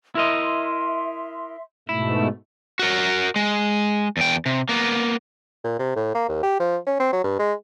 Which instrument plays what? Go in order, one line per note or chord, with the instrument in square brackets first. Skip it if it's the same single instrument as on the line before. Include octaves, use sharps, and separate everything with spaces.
[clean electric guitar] E4 A#4 D#5 [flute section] E5 C6
[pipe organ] G#2 B2 A3 [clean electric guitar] E4
[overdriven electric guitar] F#4 A#4
G#3
E2 G5
C3
A#3 B3
[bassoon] A#2
C3
A2
A#3
D#2
G4
F3
C#4
C4
F#3
G2
G#3